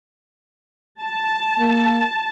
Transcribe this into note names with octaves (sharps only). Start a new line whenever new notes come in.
A5
A#3